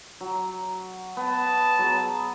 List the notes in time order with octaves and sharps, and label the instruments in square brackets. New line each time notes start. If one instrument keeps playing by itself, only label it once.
[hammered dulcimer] F#3
[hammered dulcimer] B3 [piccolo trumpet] A5
[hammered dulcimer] F#3 B3 G#4